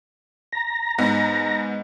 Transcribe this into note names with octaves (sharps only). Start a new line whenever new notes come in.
A#5
G#2 B3